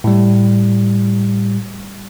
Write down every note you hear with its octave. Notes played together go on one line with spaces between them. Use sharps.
A2 G3